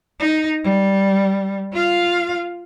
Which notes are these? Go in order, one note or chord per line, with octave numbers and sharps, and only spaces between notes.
D#4
G3
F4 F5